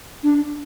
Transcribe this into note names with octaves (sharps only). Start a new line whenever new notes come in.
D4